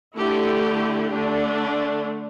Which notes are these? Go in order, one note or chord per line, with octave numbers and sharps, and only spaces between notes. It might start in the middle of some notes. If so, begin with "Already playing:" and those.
D3 A3 E4 G4
D3 A3 D4